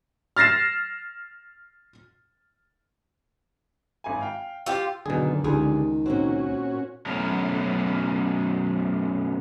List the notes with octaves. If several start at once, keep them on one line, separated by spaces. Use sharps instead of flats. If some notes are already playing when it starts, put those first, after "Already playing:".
F6 A6 A#6 C7 E7
G#1 G#5
F5 G5
F4 G4 E6
F#2 B2 D3 D#3 G#4
C#2 D#3 F3 G4 G#4
A#2 A#3 C4 C#4 F#4
F#2 B2 A3 C#4 A#4